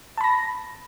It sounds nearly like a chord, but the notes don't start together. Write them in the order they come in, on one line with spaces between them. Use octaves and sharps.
A5 B5 A#6